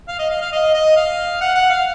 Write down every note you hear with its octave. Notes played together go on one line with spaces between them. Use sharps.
F5
D#5
F5
F5
D#5
D#5
F5
F#5
F#5
F5